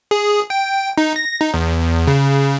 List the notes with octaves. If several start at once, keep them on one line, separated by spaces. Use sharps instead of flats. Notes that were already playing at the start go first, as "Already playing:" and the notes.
G#4
G5
D#4
A#6
D#4
E2
C#3